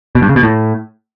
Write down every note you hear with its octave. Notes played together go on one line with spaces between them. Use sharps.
B2
G2
C#3
B2
A2